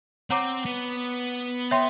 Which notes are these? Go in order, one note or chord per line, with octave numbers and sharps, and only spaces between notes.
C4 C#5 F#5 A#5 D6
B3
C#5 E5 G5 C6